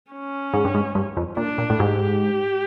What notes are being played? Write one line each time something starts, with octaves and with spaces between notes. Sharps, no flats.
C#4
G#2
G2
G#2
G2
F2
A#2 D4
A#2
A2
G#2 G4